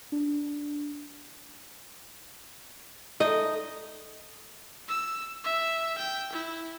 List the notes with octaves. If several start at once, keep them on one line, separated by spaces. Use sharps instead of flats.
D4
G#3 A3 D#4 D#5
E6
E5
G5
E4